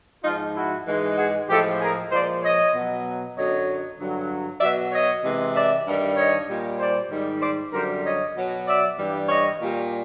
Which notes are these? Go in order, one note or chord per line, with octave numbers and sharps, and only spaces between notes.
G#2 F3 G#3 D#4 F4
E4 F#4
G#2 E3 G#3
F#4 G#4
A2 F3 G#3 G4 A4
G#4 A#4
A#2 F3 G#3 C5 D5
C#5 D#5
B2 F#3
F#2 D3 F#3 C#5 D#5
G2 D3 F#3
B2 F#3 D5 E5
C#5 D#5
C3 E3 G#3
D5 E5
G2 D#3 G3
C#5 D#5
A#2 G3
C5 D5
G#2 D#3 G3
C5 D5
F#2 D3 G3 A#4 C5
C#5 D#5
B2 F#3
D5 E5
G2 E3 G3
C#5 D#5
A#2 G3